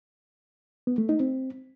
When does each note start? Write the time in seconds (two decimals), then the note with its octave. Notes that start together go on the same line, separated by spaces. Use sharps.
0.87 B3
0.98 A3
1.09 D#4
1.20 C4